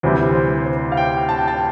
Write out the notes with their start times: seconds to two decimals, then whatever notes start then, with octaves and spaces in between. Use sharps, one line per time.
0.03 D2 C3 E3 G3 C4 C5
0.35 C5
0.65 C5
0.92 F5
0.97 G5
1.29 A5
1.38 G5
1.48 A5